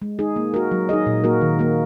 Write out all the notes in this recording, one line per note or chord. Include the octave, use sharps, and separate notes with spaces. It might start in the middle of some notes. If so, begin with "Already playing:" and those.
G#3
D#4 G#4
A#3
F#4 A#4
F#3
D#4 G#4 D#5
A#2
A#3 F#4 A#4
D#3
A#3 F#4